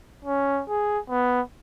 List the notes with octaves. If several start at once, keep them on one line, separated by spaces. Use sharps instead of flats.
C#4
G#4
B3